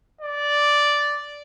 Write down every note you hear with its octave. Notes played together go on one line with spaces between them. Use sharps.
D5